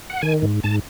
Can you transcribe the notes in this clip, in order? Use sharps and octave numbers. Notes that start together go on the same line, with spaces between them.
F#5
D#3 G#5
G#2
G#2 A5